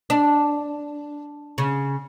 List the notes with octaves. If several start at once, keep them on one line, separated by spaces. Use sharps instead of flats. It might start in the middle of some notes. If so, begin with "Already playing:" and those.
D4
C#3